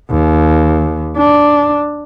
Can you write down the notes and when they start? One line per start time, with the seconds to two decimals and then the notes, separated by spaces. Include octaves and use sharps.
0.11 D#2
1.18 D4